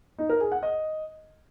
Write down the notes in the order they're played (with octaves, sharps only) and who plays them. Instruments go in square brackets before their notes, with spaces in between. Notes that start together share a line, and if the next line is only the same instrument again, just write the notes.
[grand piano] D#4
A#4
G#4
F#5
D#5